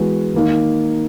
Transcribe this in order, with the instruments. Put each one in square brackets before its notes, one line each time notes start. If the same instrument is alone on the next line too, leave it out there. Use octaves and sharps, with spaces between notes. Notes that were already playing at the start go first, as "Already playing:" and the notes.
Already playing: [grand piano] E3 G#3 B3 F#4
D#3 A#3 D#4